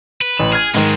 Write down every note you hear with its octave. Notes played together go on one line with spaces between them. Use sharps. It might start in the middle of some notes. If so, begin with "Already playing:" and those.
B4
A1 E7
G#4 F6 G#6
G#2 D#3 G#3 C4